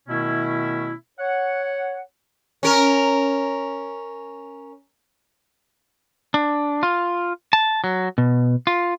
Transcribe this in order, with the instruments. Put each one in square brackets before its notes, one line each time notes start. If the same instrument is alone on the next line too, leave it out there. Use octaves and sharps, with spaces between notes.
[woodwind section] B2 D#3 A3 B3 C#4 E4
C#5 F#5
[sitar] C#4 A#4
[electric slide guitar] D4
F4
A5
F#3
B2
F4